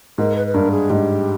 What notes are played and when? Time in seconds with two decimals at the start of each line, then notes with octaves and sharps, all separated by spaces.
0.18 G#2 A#4
0.36 B4
0.47 B4
0.54 G2 A#4
0.71 G#4
0.90 G#2 G4